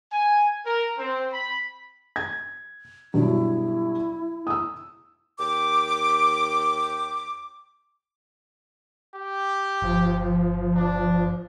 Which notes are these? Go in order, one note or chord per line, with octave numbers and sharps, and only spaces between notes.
G#5
A#4
C4
B5
G#6
G2 B2 F#3 E4
D#6 E6
D#2 G5 D6
G4
G1 F3
D4